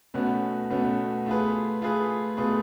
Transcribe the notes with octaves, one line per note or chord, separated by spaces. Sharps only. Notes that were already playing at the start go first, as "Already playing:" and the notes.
B2 A3 C#4 F#4 B4
B2 A3 C#4 F#4 B4
A3 F4 G#4 B4
A3 F4 G#4 B4
B2 A3 F4 G#4 B4